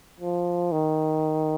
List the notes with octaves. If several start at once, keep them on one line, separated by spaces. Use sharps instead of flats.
F3
D#3